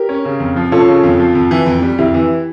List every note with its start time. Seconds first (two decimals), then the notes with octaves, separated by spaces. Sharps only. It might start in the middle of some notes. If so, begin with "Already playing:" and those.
Already playing: G4 A#4
0.09 C#4
0.25 C#3
0.40 F2
0.56 F3
0.72 C#4 F4 A4
0.88 C#3
1.04 F2
1.20 F3
1.35 F2
1.51 E3
1.66 F2
1.82 G3
1.98 F2 E4 G4
2.14 E3